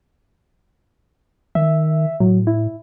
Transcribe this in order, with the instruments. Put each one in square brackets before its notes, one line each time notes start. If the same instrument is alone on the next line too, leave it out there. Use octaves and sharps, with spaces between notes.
[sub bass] D#3 [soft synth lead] E5
[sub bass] A2 [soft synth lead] F#3
[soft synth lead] E4